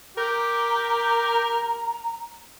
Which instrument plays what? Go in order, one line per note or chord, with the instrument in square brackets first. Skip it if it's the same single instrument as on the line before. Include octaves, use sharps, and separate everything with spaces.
[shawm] G4 [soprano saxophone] A#4 [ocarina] A#5